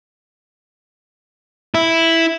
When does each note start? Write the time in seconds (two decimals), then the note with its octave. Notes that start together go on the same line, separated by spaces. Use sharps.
1.75 E4